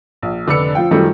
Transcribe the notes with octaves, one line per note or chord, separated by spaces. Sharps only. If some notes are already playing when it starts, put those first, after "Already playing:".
A#1
F1 D3 D4 B4 E6 C#7
F3 F4 G5
F#2 D#3 F3 G3 A3